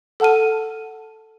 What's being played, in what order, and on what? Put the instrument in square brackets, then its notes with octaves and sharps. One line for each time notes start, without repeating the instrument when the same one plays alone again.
[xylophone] A4 F#5 A5 F6 D#7